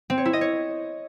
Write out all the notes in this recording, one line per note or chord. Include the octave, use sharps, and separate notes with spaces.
C4
C#5
E4
D#5
C#5